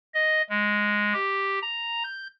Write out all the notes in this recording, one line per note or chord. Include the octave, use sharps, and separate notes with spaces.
D#5
G#3
G4
A#5
G6